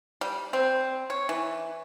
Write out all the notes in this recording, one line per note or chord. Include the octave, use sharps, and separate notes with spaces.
G3
C4
C#5
E3